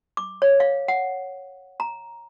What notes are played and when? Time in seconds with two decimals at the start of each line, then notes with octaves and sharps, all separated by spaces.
0.17 D6
0.42 C#5
0.60 F5
0.88 F#5
1.80 A#5